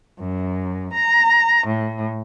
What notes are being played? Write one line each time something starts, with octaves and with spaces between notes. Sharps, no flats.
F#2
A#5
A2